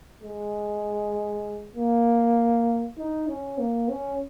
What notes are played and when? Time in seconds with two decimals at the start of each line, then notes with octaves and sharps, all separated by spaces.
0.23 G#3
1.76 A#3
2.98 D#4
3.29 C#4
3.58 A#3
3.89 C#4